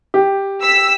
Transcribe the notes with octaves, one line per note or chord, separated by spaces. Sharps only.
G4
E6 B6